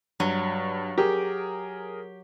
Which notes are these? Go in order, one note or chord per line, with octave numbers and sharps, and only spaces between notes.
G2 F#3
G4 G#4 A#4